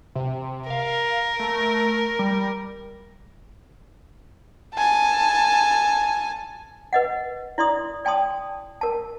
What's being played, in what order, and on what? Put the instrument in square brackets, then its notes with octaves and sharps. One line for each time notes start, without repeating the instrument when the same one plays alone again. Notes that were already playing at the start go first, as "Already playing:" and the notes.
[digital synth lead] C3
[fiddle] A#4 [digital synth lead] F5
[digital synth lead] A3
G3
[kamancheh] G#5 A5
[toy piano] B4 D#5 F#5
E4 D5 C6 D#6
D5 G5 A5 C6 D#6
A#4 A5